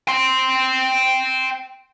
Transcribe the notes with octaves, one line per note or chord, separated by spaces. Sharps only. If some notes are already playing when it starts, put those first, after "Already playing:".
G5 C6